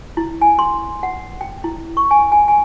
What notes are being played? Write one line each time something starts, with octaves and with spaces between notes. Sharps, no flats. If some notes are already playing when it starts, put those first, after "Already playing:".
E4
G#5
C6
F#5
G5
E4
C#6
G#5
G#5
G#5